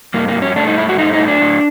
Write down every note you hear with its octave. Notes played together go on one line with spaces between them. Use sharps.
G2 A#3
A#3
G2
C#4
A3 D4
D#4
G2 E4
F#4
A3 D#4
D#4
A2
D4
A2